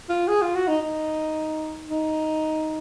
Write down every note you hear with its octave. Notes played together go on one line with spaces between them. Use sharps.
F4
G#4
F4
F#4
D#4
D#4
D#4